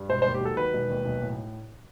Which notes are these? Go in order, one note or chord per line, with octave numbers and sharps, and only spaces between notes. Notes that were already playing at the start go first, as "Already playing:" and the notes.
Already playing: G2
E1 C5
C5
D#2
G4
F#3 A4
D#3 B4
E1
D#2
B1
A2